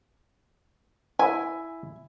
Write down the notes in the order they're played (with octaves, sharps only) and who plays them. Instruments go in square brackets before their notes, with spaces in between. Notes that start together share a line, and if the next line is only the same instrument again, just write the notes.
[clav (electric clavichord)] E4 [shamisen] G#5